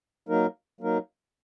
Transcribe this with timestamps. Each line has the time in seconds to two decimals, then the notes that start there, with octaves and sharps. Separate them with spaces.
0.28 F#3 A#3 D#4 A#4
0.80 F#3 A#3 D#4 A#4